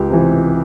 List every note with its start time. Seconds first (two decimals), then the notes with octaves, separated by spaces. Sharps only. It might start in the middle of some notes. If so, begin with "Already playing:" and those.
Already playing: C#2 G4
0.10 C3 E3